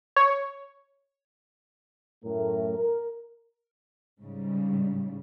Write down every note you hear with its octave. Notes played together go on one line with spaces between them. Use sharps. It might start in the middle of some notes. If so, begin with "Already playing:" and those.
C#5
F#2 A2 A3 A#4
A#4
G#2 C#3 G3